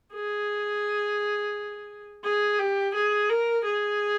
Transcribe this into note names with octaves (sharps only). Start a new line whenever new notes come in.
G#4
G#4
G4
G#4
A#4
G#4